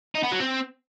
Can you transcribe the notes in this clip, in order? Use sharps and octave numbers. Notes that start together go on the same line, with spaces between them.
D#4
B3
F#3
C4